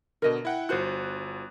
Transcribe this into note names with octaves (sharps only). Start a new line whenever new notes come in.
B2 D3 A#4 D#5
E4 F#5 G5
G1 F4 F#4 C5 F#6